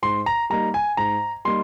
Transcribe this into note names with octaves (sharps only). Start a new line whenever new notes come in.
G#2 C6
A#5
G3 A#3 D#4 A#5
G#5
G#2 A#5
G3 A#3 D#4 C6